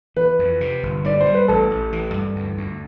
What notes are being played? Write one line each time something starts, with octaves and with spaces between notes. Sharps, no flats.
E3 B4
F2
C3
G1
G3 D5
C5
G3
B4
A1 A4
A1
E3
G2
D2
D2